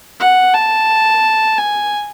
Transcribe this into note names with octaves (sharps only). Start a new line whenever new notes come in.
F#5
A5
G#5